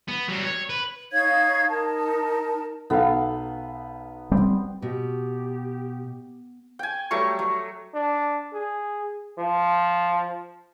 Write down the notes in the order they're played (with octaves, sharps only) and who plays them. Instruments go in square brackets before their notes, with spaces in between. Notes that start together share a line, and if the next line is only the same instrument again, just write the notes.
[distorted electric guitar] B3
F#3 G3
C#5
B4
[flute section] D#4 C#5 F5 G#6
D#4 A#4 A5
[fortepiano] B1 A4 F5 [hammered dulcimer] B3
[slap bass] G3 C4
[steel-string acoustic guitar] B2 [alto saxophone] G4
[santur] G5 G#5
F#3 G3 A3 C#6
F#3
[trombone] D4
G#4
F3